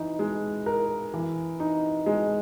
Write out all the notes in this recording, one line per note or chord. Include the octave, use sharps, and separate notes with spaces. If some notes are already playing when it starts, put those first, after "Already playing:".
Already playing: E3 D#4
G#3
A#4
E3
D#4
G#3